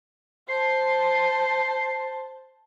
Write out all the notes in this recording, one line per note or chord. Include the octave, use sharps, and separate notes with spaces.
C5 A5 C7